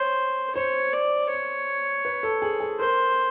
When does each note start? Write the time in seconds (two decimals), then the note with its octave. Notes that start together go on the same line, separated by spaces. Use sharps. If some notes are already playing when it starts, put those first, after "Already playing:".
Already playing: C5 C#5
0.56 C5 C#5
0.93 D5
1.30 C#5
2.05 B4
2.23 A4
2.42 G#4
2.60 G#4
2.79 A#4 C5